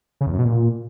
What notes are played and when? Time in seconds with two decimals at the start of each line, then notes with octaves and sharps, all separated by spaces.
0.21 C#3
0.27 E2
0.33 F#2
0.39 B2
0.45 A#2